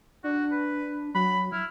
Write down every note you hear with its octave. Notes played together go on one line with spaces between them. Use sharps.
D4 F#4
B4
F#3 B5
E4 F6